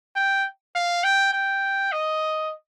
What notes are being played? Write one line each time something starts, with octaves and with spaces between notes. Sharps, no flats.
G5
F5
G5
G5
D#5